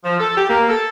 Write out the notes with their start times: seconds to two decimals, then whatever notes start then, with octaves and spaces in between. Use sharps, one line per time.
0.04 F3
0.20 A4
0.37 G4
0.49 A#3
0.69 A4